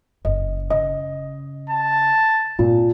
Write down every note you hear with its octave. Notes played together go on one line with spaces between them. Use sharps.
F#1 D#5
C#3 D#5
A5
A#2 C4